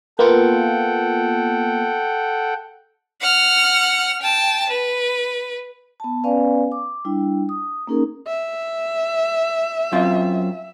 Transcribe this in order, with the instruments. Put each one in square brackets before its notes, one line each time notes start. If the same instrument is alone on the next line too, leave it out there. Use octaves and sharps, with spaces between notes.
[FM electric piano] A#3 B3 F4 [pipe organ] A4 F#5 G5
[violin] F#5 F6
G5 A5
B4
[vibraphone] B3 A5
B3 C#4 B4 D5 F5 G#5
D6
G3 D4 E4 G5
D#6
A#3 C#4 D#4 G#4 A#4
[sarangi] E5
[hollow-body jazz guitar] F#2 C4 F4